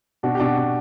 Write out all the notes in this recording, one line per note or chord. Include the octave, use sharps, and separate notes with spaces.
B2 D4 F#4
G4
B2 D4 F#4
B2